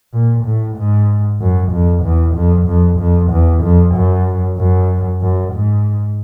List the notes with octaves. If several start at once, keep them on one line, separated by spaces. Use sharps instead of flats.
A#2
A2
G#2
F#2
F2
E2
F2
F2
F2
E2
F2
F#2
F#2
F#2
G#2